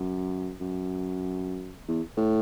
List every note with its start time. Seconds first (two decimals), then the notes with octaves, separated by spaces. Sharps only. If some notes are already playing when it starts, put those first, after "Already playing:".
Already playing: F#2
0.60 F#2
1.88 E2
2.17 A2